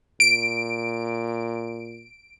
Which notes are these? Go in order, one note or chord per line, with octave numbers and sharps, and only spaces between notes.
A#2 D7